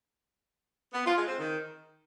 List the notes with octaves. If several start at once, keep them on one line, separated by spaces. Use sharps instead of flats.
B3
F4
G#3
C4
D#3